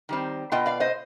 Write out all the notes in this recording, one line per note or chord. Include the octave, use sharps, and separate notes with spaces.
D#3 G3 C4
B2 B3 F4 D#5 G5
D5 F5
C5 D#5